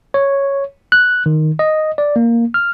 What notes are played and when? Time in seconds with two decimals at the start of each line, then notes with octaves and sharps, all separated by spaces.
0.14 C#5
0.92 F#6
1.26 D#3
1.59 D#5
1.98 D5
2.16 A#3
2.54 F6